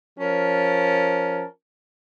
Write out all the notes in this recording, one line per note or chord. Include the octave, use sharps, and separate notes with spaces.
F3 C#4 A#4 A5